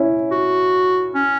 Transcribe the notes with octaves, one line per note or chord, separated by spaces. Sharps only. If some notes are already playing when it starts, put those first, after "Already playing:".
Already playing: C#4 E4
F#4
C#4